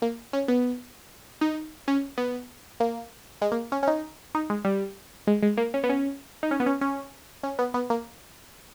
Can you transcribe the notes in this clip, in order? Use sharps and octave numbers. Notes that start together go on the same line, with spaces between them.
A#3
C#4
B3
D#4
C#4
B3
A#3
G#3
A#3
C#4
C#4
D#4
D#4
G#3
G3
G#3
G#3
A#3
C#4
B3
C#4
D#4
C#4
B3
C#4
C#4
C#4
B3
B3
A#3